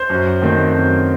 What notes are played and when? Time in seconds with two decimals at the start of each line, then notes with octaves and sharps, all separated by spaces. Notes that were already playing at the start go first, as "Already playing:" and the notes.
Already playing: C5 C6
0.10 F#2
0.42 D#3 A3 C4
0.74 F#2